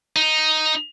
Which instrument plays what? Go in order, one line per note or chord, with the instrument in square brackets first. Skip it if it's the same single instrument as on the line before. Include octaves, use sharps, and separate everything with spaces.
[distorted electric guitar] D#4